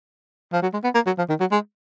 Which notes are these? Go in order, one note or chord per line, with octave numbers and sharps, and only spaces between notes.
F3
F#3
G#3
B3
A#3
F#3
F3
D#3
F#3
G#3